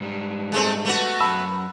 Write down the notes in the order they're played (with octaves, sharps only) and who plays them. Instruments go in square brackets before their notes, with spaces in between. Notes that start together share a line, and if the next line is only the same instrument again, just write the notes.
[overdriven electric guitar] G#2 G3
[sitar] G#3 A3 C4
A3 B3 F#4
[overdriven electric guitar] F#2 A5 [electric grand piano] B5 E6